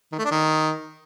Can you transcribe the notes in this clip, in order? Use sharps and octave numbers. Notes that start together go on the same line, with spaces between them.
D#3
A3
D4
D#3